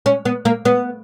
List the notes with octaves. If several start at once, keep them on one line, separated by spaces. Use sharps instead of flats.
C#4
B3
A#3
B3